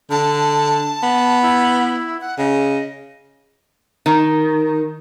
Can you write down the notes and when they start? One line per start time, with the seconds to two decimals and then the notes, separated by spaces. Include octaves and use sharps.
0.10 D3 A5
1.03 B3
1.43 E4
2.21 F#5
2.38 C#3 D#5
4.06 D#3